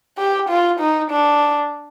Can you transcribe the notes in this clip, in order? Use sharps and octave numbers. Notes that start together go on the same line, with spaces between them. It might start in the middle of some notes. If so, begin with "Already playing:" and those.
G4
F4
D#4
D4